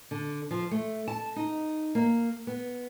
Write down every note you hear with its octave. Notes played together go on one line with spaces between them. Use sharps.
D3
F3
A3
A5
D#4
A#3
B3